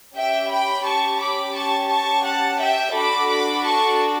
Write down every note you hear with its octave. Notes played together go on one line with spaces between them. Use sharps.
C#4 G4 E5 G5
G5 B5
A5 C#6
B5 D6
A5 C#6
A5 C#6
F#5 A5
E5 G5
D4 F#4 A4 B5 D6
B5 D6
A5 C#6